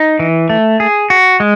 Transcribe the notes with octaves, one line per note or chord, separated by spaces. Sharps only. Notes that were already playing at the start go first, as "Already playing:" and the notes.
Already playing: D#4
E3
A3
G#4
F#4
G#3